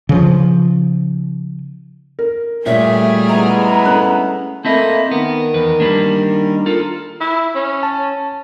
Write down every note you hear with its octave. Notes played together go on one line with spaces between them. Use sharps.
C#3 F3
A#4
A#2 G3 A3 G#4 C#5 E5
G#3 B3 E4 A#5
A3 C#4 F#6
A3 A#3 C4 E4 D#5 A5
D#3 B3 A#4
E2 B4
G3 A#3 D4
F4 A4 A#4
E4
C#4
A5